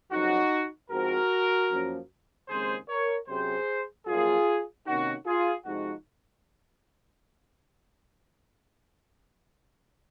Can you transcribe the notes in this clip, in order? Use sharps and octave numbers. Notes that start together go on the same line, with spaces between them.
F2 C#3 F#3 D#4 F#4
G#2 F3 C4 F#4 A#4
F#2 F3 A#3 C#4
D#2 C#3 G#3 C4 G#4 C5
A#4 C#5
C3 F#3 C#4 G#4 C5
F#2 F3 A#3 F4 G#4
C3 D#3 A#3 C#4 D#4 F#4
F4 G#4
C3 F3 G#3 D#4 F#4